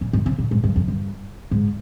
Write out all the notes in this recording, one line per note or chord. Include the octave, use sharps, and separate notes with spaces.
A#2
G#2
C3
A#2
G#2
G2
F2
G2
G#2